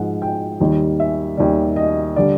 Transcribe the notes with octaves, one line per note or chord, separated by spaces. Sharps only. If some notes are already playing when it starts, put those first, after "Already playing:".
Already playing: G#2 F3 G#3 F#5
G5
D#2 D#3 G3
E5
D#2 D#3 G3 D5
D#5
D3 G3 D5